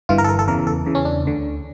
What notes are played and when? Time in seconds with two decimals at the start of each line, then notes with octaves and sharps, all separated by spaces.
0.09 G1 G2 E3 F4
0.18 A#4
0.24 A4
0.29 A#4
0.39 A4
0.48 E2 C#3 E3 A#4
0.67 A4
0.86 E2 C#3 E3
0.95 C#4
1.05 D4
1.25 D2 D3